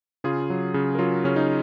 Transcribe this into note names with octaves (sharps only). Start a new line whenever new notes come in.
C#3 F4 G#4
F#3
C#3
A#4
F#3 F4 G#4
C#3 C#4
D#4